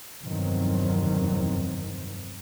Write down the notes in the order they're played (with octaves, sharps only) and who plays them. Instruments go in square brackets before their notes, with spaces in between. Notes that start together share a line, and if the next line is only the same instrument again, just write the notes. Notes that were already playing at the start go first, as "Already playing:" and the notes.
[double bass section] F1 E2 G2 D#3 F#3 C4